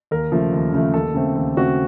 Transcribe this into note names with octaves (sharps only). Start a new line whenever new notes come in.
D#2 A#4
C#3 F3 A3
D#2
C#3 F3 A3
D#2 A4
C#3 A3 C4
D#2
C#3 A3 C4 F#4